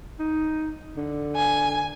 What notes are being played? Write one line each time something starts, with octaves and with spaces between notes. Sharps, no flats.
D#4
D3
G#5